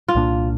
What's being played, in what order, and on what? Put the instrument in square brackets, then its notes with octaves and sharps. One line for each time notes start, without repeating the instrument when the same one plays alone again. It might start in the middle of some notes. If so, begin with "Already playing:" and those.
[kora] F4
[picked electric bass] C2 A#2 A#3 D4